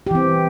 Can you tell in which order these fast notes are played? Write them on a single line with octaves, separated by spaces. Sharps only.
G4 E3 C4